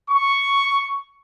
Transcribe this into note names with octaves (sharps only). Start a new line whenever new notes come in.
C#6